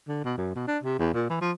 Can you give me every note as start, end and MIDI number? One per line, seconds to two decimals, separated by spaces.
0.08 0.20 50
0.25 0.35 47
0.37 0.53 42
0.55 0.67 47
0.68 0.78 62
0.84 0.98 48
0.99 1.13 40
1.14 1.26 46
1.30 1.41 52
1.41 1.52 53